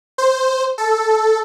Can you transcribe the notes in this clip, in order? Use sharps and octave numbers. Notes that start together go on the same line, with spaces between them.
C5
A4